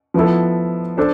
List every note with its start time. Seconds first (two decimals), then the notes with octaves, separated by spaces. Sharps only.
0.14 F3 B3 E4 A4
0.97 D4 A4 C5